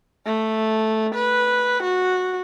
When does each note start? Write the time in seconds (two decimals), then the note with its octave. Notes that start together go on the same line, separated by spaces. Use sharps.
0.26 A3
1.15 B4
1.83 F#4